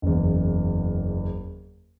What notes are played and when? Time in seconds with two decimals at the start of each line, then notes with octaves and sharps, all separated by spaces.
0.02 F#1 E2